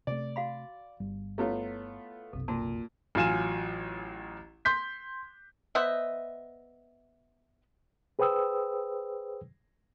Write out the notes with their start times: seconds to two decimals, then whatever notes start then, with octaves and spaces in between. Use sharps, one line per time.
0.07 C3 A3 D5
0.36 F#4 F5 B5
1.00 G1 G3
1.38 A3 B3 E4 F4 C#5
2.33 F#1 B1 C3 A4
2.48 A#2 F4 F#4 A5
3.15 A1 F#3 F4 G#5 E7
4.65 C6 G6 B6
5.75 B3 C5 D#5 E5
8.19 G#4 B4 C5 G5 D#6 E6